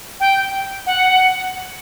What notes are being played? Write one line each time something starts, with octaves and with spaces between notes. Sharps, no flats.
G5
F#5